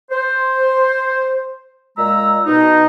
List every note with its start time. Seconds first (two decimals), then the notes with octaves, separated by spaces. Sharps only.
0.11 C5
1.98 A#2 G#3 A#5 E6
2.45 B2 D#4